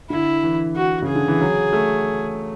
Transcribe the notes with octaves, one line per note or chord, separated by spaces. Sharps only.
D3 E4
E3
F#4
C#3
G#4
D3
E3
F#3
A3